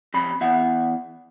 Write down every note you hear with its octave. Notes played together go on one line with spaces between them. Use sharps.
F2 C3 B5
E2 E5 F#5